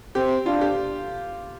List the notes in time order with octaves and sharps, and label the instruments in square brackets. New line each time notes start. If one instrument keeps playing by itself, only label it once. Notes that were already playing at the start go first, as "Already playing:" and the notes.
[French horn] C4 [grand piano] G4
[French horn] D4 [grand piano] F4
[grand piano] G4